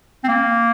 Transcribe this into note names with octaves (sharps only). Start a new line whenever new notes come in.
C4
A#3